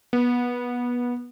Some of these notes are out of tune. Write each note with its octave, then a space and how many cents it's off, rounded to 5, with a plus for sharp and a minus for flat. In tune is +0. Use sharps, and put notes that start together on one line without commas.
B3 -20